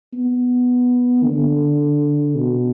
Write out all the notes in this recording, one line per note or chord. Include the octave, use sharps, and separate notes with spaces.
B3
D3
B2